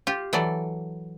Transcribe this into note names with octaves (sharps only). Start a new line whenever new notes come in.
F4 G4
E3 F#3 A4 D5